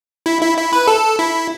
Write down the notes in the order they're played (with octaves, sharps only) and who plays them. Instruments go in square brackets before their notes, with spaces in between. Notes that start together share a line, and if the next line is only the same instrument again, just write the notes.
[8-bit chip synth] E4
E4
E4
B4
A4
E4